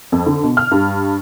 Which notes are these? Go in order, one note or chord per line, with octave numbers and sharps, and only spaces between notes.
F2
D3
B2
F6
G2